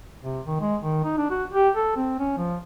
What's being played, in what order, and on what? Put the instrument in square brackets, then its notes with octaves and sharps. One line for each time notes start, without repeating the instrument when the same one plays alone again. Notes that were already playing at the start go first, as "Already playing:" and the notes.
[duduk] C3
D#3
G#3
D#3
D#4
D4
F#4
G4
A4
C4
C#4
F3